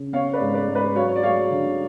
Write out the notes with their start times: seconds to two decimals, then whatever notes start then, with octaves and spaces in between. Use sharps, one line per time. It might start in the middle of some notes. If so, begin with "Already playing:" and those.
Already playing: C#3
0.13 B3 C#5 F5
0.33 B4 D5
0.41 G#2
0.54 B4 D5
0.68 G#2
0.75 B4 D5
0.95 F#3 C#5 F5
1.07 C#5
1.16 D5
1.23 F#3 C#5 F5
1.51 D3